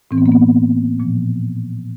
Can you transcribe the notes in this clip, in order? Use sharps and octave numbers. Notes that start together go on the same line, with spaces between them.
A2 E3 C4
B3
A#3
B3
A#2 F3